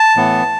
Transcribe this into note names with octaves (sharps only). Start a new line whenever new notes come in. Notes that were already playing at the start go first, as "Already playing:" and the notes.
Already playing: A5
A2 E3 B3